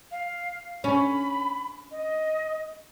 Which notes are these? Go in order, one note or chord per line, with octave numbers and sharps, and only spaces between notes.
F5
C#4 B5
D#5